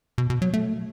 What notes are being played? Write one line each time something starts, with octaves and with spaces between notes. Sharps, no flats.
B2
B2
F#3
A3